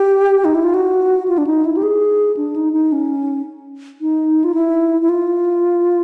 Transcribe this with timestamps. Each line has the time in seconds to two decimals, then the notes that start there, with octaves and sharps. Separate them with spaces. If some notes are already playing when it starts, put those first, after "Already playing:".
Already playing: G4
0.45 D#4
0.55 E4
0.64 F4
0.74 F#4
1.28 F4
1.38 D4
1.47 D#4
1.65 E4
1.77 G4
1.83 G#4
2.37 D4
2.56 D#4
2.73 D#4
2.92 C#4
4.01 D#4
4.44 F4
4.55 E4
5.02 E4
5.09 F4